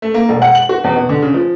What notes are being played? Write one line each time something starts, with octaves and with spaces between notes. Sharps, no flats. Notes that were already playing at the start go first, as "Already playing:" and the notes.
A3
A#3
E1
F#5
F#7
F#4
E2
B2
D3
C#3
F3